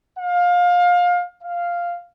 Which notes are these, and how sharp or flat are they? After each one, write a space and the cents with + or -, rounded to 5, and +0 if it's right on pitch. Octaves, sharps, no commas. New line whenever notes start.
F5 +25
F5 -5